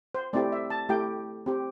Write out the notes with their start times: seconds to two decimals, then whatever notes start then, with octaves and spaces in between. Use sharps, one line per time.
0.15 C5
0.33 A3 C4 E4 G4 D5
0.52 E5
0.70 A5
0.89 A3 E4 G4 G5
1.46 C4 G4